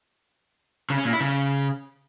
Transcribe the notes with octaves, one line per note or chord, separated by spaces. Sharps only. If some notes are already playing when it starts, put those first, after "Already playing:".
C#3
C#4
A#2
E4
C#3